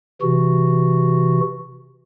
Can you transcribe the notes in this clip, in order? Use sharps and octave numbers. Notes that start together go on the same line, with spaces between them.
C3 E3 F#4